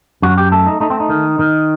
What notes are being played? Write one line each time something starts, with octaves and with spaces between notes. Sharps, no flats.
F#2 F#4
G4
A3 A4
D#4
A3 D#4
C4
D#4
D#3
D#3